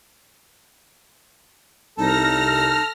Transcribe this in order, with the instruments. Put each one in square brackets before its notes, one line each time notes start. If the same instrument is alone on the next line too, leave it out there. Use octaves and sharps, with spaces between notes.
[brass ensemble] C2 [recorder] D#4 [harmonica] A4 [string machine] F6 A#6